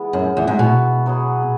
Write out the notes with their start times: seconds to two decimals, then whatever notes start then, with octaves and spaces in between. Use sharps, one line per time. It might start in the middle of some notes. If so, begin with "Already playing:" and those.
Already playing: E3 G#3 B3
0.13 F#2
0.37 E2
0.47 G#2
0.59 B2
1.06 F#3 B3 G#4